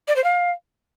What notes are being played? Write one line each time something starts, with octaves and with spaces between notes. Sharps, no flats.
D5
C5
F5